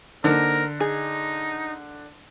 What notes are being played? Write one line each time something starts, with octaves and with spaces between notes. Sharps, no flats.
D3 A#3 D#4 A#4 C5
D#4 G#4